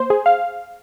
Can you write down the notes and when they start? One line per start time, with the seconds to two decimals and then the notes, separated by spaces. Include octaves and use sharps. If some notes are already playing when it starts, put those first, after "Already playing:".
Already playing: A#3 C5
0.10 G#4
0.26 F5